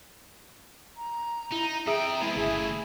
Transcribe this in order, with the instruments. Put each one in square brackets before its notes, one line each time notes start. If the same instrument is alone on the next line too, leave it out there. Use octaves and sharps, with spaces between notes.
[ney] A#5
[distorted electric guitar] D#4 [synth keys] E4
[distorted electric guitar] F2 G5 [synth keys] G#4 E5 D#6
[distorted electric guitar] G#3 B3 [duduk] E4
[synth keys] G1 E5 [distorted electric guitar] C#3 A3 [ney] G#4